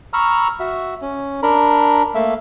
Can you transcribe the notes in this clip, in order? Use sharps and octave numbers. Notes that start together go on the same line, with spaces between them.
A#5 B5 C#6 E6 F6
F#4 E5
C#4
D4 A#4 B5
A3 A#3 E5